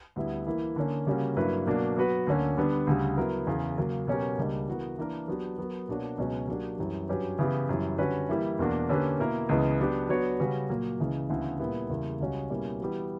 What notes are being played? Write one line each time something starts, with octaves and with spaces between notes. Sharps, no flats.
D2 D3 G3 B3 E4
E3 A#3 E4
D3 A#3 C#4
C#3 G3 A#3 C#4 F#4
G2 F#3 A#3 E4 B4
B2 F#3 A#3 D4
F#3 B3 F#4 B4
D2 D3 A#3 C#4
D3 G3 B3 D4
D2 C#3 G3
F#3 B3 E4 A#4
E2 C#3 E3
C#3 F#3 A#3
B2 F#3 C#4 G4 A#4
C#2 C#3 G3 A#3 D4
E3 B3 F#4 A#4
E3 A#3 D4 A#4
F#3 B3 D4 G4 B4
F#3 B3 F#4 A#4
B2 A#3 D4 F#4 C#5
C#2 B2 F#3 C#4 F#4
F#3 A#3 D4 G4
F#2 E3 G3
G2 F#3 C#4 G4 B4
C#3 E3 B3 E4 G4
F#2 E3 G3
D3 G3 C#4 F#4 B4
E3 G3 A#3 E4
E2 B2 A#3 D4 F#4
D3 A#3 C#4 G4 B4
B2 A#3 E4 A#4
C#2 C#3 E3 B3
F#3 B3 D4 G4
F#3 B3 D4 F#4 C#5
C#3 G3 C#4 F#4 B4
A#2 F#3 A#3
C#2 C#3 E3
D2 C#3 E3 B3 E4
A#2 G3 B3 E4
E2 C#3 G3 A#3 E4
C#2 C#3 G3 C#4 F#4
B2 G3 A#3 C#4 E4
E3 G3 B3 F#4